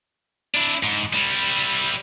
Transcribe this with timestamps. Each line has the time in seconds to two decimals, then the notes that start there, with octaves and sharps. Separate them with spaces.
0.55 D4 E4
0.83 G#2
1.13 G3 E4